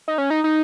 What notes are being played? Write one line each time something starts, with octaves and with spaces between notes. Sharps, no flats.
D#4
C#4
D#4
D#4